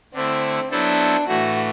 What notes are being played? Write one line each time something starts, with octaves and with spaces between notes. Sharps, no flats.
D3 A3 C4 E4
F#3 B3 D4 E4 A4 C5
A2 E3 A3 F#4